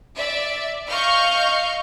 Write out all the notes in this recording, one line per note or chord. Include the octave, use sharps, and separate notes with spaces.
D5 E5
D#5 F5 C#6 F6 G6